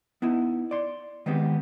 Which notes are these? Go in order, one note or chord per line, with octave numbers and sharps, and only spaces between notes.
B3 D#4 E4
D5 C6
D#3 G#3 B3 C4 G4